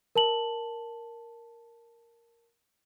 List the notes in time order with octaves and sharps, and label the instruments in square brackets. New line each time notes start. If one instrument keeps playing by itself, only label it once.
[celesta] A#4 A5 F#7